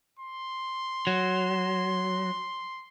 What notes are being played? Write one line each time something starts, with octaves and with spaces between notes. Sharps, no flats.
C6
F#3